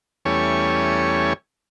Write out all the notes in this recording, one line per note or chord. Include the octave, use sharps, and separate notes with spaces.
E2 G3 A3 C#4 C#5 G#5